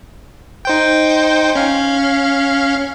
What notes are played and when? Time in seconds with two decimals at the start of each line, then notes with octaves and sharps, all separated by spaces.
0.65 D#4 C5 G5
1.56 C#4 F5